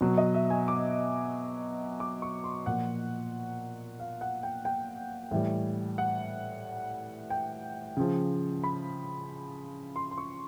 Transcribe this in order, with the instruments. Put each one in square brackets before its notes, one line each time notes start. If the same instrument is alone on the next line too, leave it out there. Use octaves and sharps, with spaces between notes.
[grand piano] B2 F#3
D#5
E5
G#5
D6
D6
C#6
C6
A#2 F3 F#5
F5
F#5
G5
G5
A2 E3 G3
F#5
G5
C#3 F3
B5
C6
C6
C#6